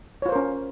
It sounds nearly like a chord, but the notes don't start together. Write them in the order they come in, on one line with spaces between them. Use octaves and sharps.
C#5 F4 C5 A#4 C#4